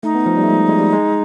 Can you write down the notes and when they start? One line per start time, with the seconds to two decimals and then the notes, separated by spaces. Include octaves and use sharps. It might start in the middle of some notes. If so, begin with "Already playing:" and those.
0.03 A3 D#4
0.15 B3
0.26 F3
0.37 G3
0.43 A3
0.48 G#3
0.69 G#3
0.78 G3
0.93 G#3